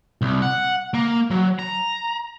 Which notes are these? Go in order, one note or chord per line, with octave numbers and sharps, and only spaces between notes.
C2
F#5
A#3
F#3
A#5